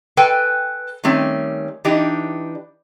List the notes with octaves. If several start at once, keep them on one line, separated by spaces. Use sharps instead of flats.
A4 B4 G5 G#5
D#3 G3 A3 C4 C#4
E3 D4 D#4 G4